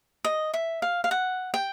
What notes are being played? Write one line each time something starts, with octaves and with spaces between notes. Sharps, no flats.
D#5
E5
F5
F5
F#5
G5